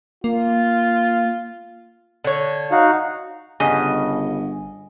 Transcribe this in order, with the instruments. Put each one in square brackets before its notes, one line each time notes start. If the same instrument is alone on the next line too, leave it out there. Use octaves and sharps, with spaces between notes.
[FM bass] A#3 [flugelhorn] F4
[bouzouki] D3 C#5
[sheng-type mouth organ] D#4 F#4 [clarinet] F5
[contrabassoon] G1 [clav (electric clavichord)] G2 C#3 [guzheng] D#5 [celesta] F#5 G#5